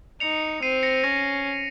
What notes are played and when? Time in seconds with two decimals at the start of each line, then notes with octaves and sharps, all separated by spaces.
0.20 D#4 C#7 F7
0.62 C4 C7 D#7
0.83 A#6 C#7
1.03 C#4 A#6